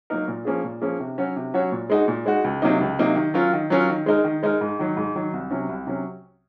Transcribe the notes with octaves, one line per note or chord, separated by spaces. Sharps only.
F#3 A#3 D#4 A#4
A#2
F3 A#3 C#4 G#4
A#2
F3 A#3 C#4 G#4
C3
F#3 C#4 F#4 C#5
C3
F#3 C#4 F#4 C#5
A#2
G#3 D#4 F#4
A#2
G#3 D#4 F#4
C#2
C3 F#3 A#3 D#4
C#2
C3 F#3 A#3 D#4
D#3
F#3 C#4 F4 A#4
D#3
F#3 C#4 F4 A#4
D#3
G#3 D#4 A#4
D#3
G#3 D#4 A#4
G#2
D#3 F#3
G#2
D#3 F#3
C2
C3 F#3 C#4
C2
C3 F#3 C#4